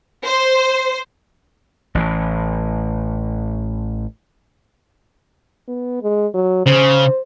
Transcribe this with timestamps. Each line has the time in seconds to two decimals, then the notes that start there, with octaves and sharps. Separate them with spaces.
0.24 C5
1.95 A1 A2 E3
5.68 B3
6.02 G#3
6.34 F#3
6.66 C#3 C5